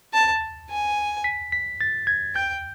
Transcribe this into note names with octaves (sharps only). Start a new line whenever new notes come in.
A5
G#5
B6
B6
A6
G#6
G5 G6